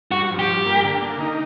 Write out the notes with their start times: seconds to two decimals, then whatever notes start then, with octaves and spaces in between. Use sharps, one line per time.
0.11 G2 F#4
0.30 F3
0.39 G4
0.48 G2
0.66 A#3
0.84 D3
1.02 A#3
1.20 D#4